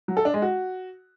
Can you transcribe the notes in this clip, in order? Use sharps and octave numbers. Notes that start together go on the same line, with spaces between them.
F#3
A4
D4
G#3
F#4